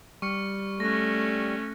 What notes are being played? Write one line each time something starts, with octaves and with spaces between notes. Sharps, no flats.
G3 C#6 F6 C#7
A3 C#4 F#6 A#6